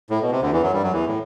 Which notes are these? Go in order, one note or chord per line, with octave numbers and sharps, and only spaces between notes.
A2
B2
C3
D2 D3
E2 E3
F#2 F#3
G2 G3
F#2 F#3
E2 E3
A2